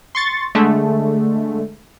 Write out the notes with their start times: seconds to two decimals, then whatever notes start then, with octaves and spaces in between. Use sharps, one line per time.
0.15 C6 C#6 A6
0.55 D3 G#3 A3